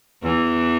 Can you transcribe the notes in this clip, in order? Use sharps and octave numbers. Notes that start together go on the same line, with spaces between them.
E2 E3